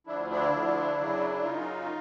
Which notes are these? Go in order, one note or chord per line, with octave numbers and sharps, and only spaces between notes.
D2 D3 F3 D4 E4
D4 E4
D2 D3 F3
F#2 C#3 F#3
F#2 C#3 F#3 D#4 F4